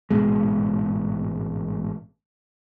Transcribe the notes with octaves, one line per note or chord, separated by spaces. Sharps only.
A1 G#2 B2 G#3